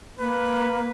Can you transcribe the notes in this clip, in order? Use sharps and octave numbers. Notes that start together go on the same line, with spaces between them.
A#3 B4